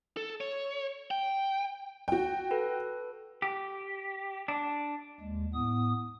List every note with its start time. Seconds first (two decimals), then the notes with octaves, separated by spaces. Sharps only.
0.17 A4
0.41 C#5
1.11 G5
2.08 F#4 G5
2.51 A4 B4
3.42 G4
4.48 D4
5.21 D#2 G#3
5.54 A2 B3 D#6